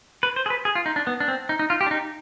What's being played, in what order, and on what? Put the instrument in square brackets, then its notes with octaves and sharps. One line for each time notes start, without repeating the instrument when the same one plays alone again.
[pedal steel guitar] B4
C5
G#4
B4
G#4
F4
D#4
D4
B3
D4
C4
D#4
D#4
F4
G4
D4
D#4